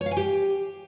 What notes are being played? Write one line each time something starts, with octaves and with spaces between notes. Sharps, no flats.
C#5
F5
G#5
G4